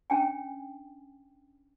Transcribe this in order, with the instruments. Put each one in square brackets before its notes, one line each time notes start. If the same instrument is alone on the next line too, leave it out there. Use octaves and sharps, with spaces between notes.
[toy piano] C#4 D4 G5 G#5